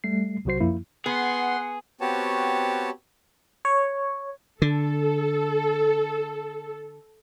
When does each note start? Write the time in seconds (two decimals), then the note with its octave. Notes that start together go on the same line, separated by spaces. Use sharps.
0.04 G3 A3 C7
0.45 B1 C3 F#3 F#4 C5 C7
0.60 F#2 F3 A#3 E4
1.06 B3 G#4 F#5 C6
2.01 B3 C4 F#4 G4 C#5 A5
3.65 C#5
4.62 D3 A4